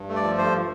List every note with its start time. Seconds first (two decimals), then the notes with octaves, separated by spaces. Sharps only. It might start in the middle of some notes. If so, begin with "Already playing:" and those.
Already playing: G2
0.09 A3
0.16 D5
0.23 F3
0.38 G2 C5